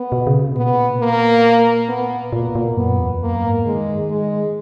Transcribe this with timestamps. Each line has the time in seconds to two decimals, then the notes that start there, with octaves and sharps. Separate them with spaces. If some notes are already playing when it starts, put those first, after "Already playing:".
Already playing: B3
0.12 B2
0.27 C#3
0.40 B2
0.56 A#2 B3
1.00 A#3
1.89 B3
2.32 A#2 A#3
2.55 A#2
2.77 F#2 B3
3.00 E2
3.22 F#2 A#3
3.44 G#2
3.66 D#3 G#3
4.10 G#3